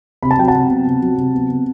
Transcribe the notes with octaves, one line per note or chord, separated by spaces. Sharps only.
C3 B5
A5
F#3 G5
F#5 A5
C3
B3
C3
F#3
C3
B3
C3